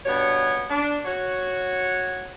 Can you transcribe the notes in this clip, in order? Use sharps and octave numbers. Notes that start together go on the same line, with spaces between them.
G2 B2 B3 C#5
D4
F#4 C#5